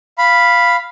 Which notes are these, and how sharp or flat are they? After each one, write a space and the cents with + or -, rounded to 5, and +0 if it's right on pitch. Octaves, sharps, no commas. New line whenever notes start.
F5 -5 B5 +0